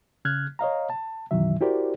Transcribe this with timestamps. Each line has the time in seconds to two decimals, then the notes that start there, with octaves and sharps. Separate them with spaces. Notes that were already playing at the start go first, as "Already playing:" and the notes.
0.25 C#3 F6 F#6 G#6
0.59 C#5 D#5 F5 A#5
0.90 A5
1.31 F#2 B2 D#3 E3 F#3 E5
1.61 E4 F#4 G4 A#4 C5 D5